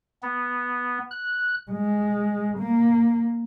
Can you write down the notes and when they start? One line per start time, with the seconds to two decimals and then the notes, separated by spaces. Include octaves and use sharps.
0.22 B3
1.11 F#6
1.71 G#3
2.58 A#3